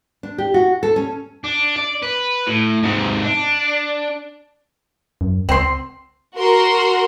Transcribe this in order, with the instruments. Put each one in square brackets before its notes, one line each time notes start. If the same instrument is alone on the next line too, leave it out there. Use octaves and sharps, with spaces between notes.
[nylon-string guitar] D4
G4
F#4
A4
C#4
[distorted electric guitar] D4
D5
B4
A2
G#2 C3
D4
[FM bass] F#2
[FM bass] C#2 [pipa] C4 C6
[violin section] F#4 A#4 C6